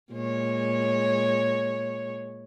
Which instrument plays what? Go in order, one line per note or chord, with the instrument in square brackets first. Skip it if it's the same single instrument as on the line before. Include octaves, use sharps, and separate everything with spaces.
[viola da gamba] A#2 G#3 C#5